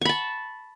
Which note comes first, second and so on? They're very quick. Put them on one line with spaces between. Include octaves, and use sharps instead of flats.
C#6 B5 A5